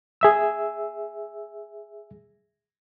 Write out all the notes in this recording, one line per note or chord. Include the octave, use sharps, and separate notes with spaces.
G#4 E5 E6